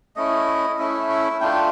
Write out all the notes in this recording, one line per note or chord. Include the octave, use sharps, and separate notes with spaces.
A3 C#4 E4 D#5
A3 C#4 E4 E5
E5
A3 D4 F4 G5